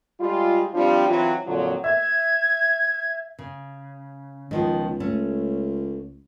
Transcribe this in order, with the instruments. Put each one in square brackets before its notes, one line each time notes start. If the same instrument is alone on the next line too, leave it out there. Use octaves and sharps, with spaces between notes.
[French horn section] G3 G#3 F4
F3 G3 C4 D4 F4
E3 F#3 C4 F4
F2 A#2 D3 F3 F#3
[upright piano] E5 [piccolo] G#6
[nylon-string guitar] C#3
[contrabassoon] C#2 [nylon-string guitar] D#3 F3 B3
[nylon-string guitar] A3 C#4